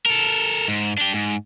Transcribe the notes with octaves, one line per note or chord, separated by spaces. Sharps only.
A4 A#4
G#2
D4 G4
G#2